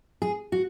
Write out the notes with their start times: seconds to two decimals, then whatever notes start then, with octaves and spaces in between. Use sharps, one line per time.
0.22 G#4
0.52 F#4